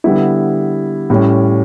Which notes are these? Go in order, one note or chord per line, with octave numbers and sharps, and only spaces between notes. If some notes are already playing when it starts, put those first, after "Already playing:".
D3 G3 B3 E4
A2 G3 C#4